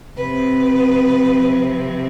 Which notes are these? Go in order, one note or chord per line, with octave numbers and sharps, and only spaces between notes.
C3 F3 C4 B4